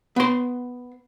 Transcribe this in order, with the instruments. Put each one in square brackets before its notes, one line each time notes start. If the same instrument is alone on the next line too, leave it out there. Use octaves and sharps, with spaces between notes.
[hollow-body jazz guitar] B3 C6